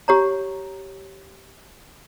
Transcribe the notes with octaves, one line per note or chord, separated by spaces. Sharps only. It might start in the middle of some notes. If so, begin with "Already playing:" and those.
G4 C#5 A#5